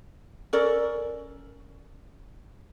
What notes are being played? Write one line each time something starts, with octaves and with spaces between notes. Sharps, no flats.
C#4 A4 A#4 D5